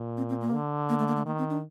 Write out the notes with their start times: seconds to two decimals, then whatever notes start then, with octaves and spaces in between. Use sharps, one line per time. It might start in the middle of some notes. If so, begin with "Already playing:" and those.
Already playing: A#2
0.17 C4
0.29 C4
0.41 A#3
0.54 D3
0.89 A#3
0.99 A3
1.07 A#3
1.16 A3
1.25 D#3 A#3
1.38 C4
1.50 D4